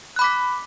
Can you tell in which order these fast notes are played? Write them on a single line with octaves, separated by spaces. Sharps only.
F#6 B5 D6 B6